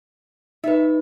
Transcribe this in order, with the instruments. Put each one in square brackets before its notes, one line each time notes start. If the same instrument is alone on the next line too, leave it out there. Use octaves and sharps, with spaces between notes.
[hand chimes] D#4 B4 [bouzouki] E5